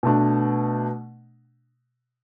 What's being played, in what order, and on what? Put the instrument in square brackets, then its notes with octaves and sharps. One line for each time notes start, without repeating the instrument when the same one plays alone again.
[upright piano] B2 A3 D4